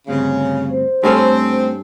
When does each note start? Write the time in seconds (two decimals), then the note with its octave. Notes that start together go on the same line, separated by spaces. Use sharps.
0.07 D2 G2 C#3 C4
0.70 C5
1.03 G2 A3 C4 C#4 A4